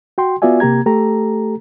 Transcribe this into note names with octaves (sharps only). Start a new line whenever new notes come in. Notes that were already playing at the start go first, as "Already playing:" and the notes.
F#4 G5 C6
B3 F4 F#4 D5 E5 G#5
C3 A#3 G4 A#5 G#6
A3 G4 A4 A#5